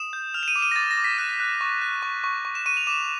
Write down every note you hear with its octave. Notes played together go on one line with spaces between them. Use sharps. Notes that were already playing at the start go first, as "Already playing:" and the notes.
Already playing: D#6 E7
G6
F6 F7
E7
D#7
D6
D#7
A#6
D6 A6
A#6
D6
B6
F#6 D#7
F#6
C#6
F#6
C#6
C#6
C#6
E7
C#6 D#7
F7
D6 E7